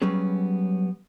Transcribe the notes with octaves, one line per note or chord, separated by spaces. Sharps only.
F#3 G3 B3 C#4 G#4